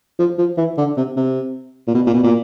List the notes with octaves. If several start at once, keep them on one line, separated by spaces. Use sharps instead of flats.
F3
F3
E3
D3
C3
C3
A#2
B2
A#2
B2
A#2